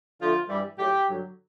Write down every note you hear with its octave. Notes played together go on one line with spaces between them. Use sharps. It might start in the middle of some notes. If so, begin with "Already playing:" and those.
D3 F3 A3 F4
G2 E3 G3
A2 F#3 A3 G4
G2 D3 F#3